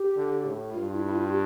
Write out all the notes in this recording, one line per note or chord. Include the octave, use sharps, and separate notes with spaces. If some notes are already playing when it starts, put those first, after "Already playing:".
Already playing: G4
D3
A2
G2 F4
E4
E4
F4
G4